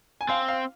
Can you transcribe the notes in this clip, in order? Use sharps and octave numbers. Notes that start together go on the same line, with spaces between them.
G#5
C4 F5
F5